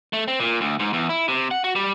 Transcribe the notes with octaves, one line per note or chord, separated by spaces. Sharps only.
A3
C4
A#2
D2
G#2
E2
E4
C3
F#5
F#4
G3